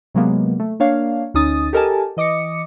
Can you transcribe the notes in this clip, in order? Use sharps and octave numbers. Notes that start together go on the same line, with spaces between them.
C3 F#3 G#3 A#3 B3
A3
A#3 D4 C#5 F5
D2 C#4 D#4 D#6 A6
G4 A4 A#4 D#5 G#5 A5
E3 D#5 D6 D#6 C#7